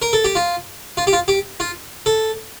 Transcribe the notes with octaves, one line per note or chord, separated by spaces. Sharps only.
A#4
A4
G4
F4
F4
G4
F4
G4
F4
A4